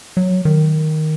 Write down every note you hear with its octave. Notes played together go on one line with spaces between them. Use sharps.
F#3
D#3